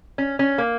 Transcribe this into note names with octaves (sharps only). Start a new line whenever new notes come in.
C#4
C#4
A#3